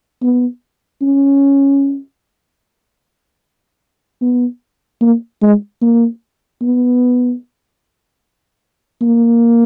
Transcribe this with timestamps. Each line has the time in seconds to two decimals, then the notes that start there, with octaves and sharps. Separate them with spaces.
0.22 B3
1.02 C#4
4.21 B3
5.01 A#3
5.42 G#3
5.81 A#3
6.62 B3
9.01 A#3